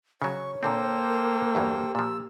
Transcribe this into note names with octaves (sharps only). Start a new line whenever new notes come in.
C#3 F#3 C#5 C#6
A#2 D3 A#3 C4 A4 C5 G5
A#4
E2 G2 F#3 G4
A#2 F3 E6